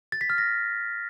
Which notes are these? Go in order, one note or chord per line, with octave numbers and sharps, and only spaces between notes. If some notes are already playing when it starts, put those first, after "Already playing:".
A6
B6
F6
A#6